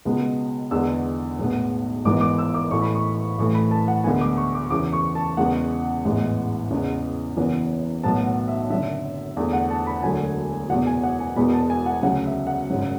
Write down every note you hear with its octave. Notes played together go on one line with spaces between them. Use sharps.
C#2 B2 G#3 B3
E2 D3 G#3 B3 E6
B1 A2 G#3 B3
G#1 G#2 E3 B3 D6
D6
E6
D6
A1 A2 E3 A3 C#6
B5
C#6
A1 A2 E3 A3 C#6
B5
A5
F#5
D2 D3 G#3 B3 G#5
D6
C#6
D6
E2 C#3 E3 D6
C#6
A5
E2 C#3 G#3 B3 F#5
A1 G#2 E3 G#3 B3
E2 C#3 G#3 B3
F#1 F#2 E3 B3
B1 A2 F#3 B3 A5
F#5
E5
F#1 F#2 D3 E5
E2 D3 A3
F#5
A5
B5
E1 D2 D3 F#3 A3 G#5
F#1 E2 B2 F#5
G#5
F#5
G#5
E1 E2 B2 G#3 B3 B5
A5
G#5
F#5
D2 C#3 F#3 F#5
E5
F#5
G#1 F#2 C#3 F#3